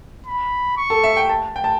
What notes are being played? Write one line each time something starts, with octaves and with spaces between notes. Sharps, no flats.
B5
C#6
A4
E5
G5
A5
G5
A5